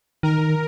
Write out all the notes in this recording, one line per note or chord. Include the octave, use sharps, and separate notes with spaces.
D#3 A#4